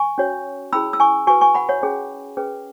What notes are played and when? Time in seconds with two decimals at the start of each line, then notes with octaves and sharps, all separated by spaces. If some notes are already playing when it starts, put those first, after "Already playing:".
Already playing: G#5 C#6
0.18 C#4 F#4 C#5
0.72 C#4 E4 G#4 B5 E6
0.93 E6
1.00 G#5 C#6
1.27 F#4 B4 G#5 C#6
1.41 G#5 C#6
1.54 F#5 B5
1.69 C#5 F#5
1.82 C#4 G#4 C#5
2.37 C#4 G#4 B4